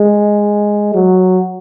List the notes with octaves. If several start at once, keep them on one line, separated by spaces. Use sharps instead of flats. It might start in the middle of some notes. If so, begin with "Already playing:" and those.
Already playing: G#3
F#3